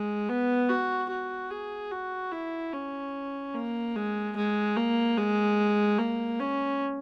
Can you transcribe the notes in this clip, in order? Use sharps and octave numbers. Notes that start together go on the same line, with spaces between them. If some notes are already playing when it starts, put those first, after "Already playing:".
Already playing: G#3
B3
F#4
F#4
G#4
F#4
E4
C#4
A#3
G#3
G#3
A#3
G#3
A#3
C#4